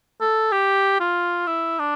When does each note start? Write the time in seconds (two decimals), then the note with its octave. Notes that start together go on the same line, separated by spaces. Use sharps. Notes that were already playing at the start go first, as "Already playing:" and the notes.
0.21 A4
0.52 G4
1.00 F4
1.47 E4
1.79 D4